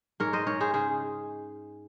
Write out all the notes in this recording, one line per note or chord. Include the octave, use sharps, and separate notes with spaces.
G#2 A#4 C#5
C5 D#5
G#2 A#4 C#5
G#4 C5
C#3 G#4 C5